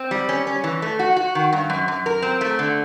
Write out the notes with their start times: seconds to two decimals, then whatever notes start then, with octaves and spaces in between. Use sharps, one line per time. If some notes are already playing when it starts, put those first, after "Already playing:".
Already playing: C4
0.11 G3
0.29 C#4
0.47 C#4
0.64 E3
0.82 A3
0.99 F#4
1.17 F#4
1.35 D#3
1.53 G2
1.70 F#2
1.88 F#2
2.06 A#4
2.22 C4
2.41 A3
2.59 D3